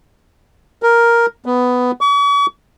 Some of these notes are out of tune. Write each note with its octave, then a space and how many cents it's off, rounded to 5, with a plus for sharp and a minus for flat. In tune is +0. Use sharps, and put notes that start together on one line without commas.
A#4 +5
B3 +10
C#6 +45